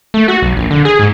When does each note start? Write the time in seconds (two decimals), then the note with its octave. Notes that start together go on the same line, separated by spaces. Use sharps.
0.14 A3
0.28 F#4
0.42 B1
0.57 A#1
0.71 D3
0.85 G#4
0.99 G#2